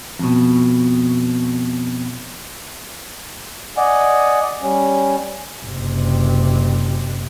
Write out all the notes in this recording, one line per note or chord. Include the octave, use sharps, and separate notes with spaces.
F2 B2
D5 D#5 F#5 G#5
G3 C#4
F#1 C3